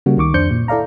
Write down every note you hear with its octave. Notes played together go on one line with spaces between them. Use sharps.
C#3 G3 A#3 F#4
C#2 D#3 C#6 D6
F2 D4 C5 G6 C#7
A#2
E4 A4 D5 F5 A#5